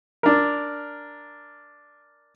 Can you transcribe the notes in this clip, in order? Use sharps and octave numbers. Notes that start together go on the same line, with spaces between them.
D4 A#4